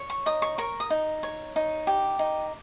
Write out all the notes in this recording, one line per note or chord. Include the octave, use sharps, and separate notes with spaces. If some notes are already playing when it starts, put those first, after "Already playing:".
Already playing: C#5
C#6
D#4 D#6
C#6
A#4 C#6
D#6
D#4
C#5
D#4
G4
D#4